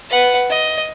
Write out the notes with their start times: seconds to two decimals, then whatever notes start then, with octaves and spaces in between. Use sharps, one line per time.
0.10 B4 F#5
0.50 D#5